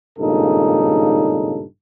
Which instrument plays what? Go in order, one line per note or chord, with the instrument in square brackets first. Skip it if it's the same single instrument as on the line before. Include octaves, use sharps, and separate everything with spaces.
[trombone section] G#1 G2 A#2 C#3 D#4 A4